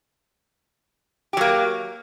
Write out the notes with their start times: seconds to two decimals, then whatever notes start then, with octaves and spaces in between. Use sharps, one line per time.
1.33 G4
1.37 F#3
1.41 A#3